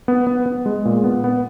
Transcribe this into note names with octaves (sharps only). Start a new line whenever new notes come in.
B3
B3
B3
G#3
A#2
B3
B3